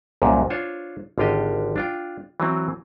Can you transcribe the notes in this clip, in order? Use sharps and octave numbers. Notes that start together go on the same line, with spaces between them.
C2 F#2 A#2
D4 F4 C5 C#5
G#1 D3 F4 G4 D#5
D4 F4 G5
E3 F#3 C4